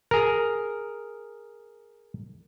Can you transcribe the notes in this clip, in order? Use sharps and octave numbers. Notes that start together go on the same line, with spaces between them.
G#4 A#4